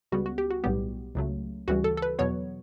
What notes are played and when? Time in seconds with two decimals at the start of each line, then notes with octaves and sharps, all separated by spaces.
0.12 C#2 C#3 G3 B3 F#4
0.26 F#4
0.38 G4
0.51 F#4
0.64 B1 A2 G3 B3 G4
1.15 C#2 C#3 F#3 A3
1.68 D2 C#3 E3 G3 F#4
1.84 A4
1.97 A4
2.02 B4
2.19 E2 B2 F#3 B3 C#5